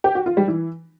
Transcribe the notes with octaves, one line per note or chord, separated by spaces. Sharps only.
G4
F#4
F4
G3
E3